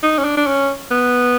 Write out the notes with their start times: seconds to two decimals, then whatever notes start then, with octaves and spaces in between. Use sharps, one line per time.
0.03 D#4
0.18 C#4
0.25 D4
0.37 D4
0.47 C#4
0.91 B3